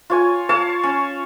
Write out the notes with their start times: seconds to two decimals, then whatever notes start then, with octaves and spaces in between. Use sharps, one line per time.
0.10 F4 C#5 G#5
0.49 C#5 F5 A5
0.84 C#4